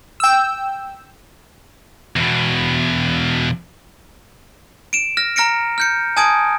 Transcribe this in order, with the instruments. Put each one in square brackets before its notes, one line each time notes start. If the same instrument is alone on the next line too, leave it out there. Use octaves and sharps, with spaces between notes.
[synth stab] G5 E6
[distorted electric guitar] E2 B2
[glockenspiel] D7 E7
F6 A#6
A#5 F6 A#6 C#7 D7
F6 G6 C#7
G#5 A5 D#6 G#6 D7